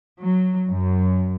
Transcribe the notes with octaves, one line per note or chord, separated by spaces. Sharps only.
F#3
F#2